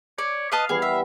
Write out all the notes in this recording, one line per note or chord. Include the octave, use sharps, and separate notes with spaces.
C#5 D5
B4 D#5 F5 A5
E3 G3 B3 G#4
E5